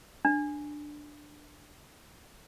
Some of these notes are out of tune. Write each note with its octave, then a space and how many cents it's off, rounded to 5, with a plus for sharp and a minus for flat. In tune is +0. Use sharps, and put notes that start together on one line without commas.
D4 +10